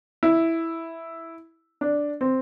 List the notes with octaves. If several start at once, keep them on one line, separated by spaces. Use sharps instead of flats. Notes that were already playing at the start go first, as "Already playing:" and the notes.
E4
D4
C4